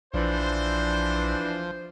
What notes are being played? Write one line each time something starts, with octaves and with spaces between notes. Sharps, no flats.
A#1 E3 F3 D4 C5